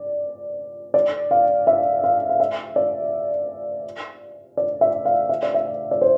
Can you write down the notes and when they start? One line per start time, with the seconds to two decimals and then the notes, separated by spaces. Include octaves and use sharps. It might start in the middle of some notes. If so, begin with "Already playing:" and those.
Already playing: D5
0.94 D5
1.31 F5
1.67 E5
2.04 F5
2.29 F5
2.40 E5
2.76 D5
4.57 D5
4.81 E5
5.05 F5
5.29 E5
5.43 D5
5.54 E5
5.91 D5
6.02 C5